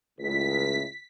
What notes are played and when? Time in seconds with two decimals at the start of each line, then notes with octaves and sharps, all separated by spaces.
0.19 C#2 A2 B6